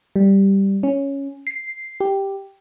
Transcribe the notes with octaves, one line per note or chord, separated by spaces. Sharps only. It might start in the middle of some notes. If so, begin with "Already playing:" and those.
G3
C#4
C7
G4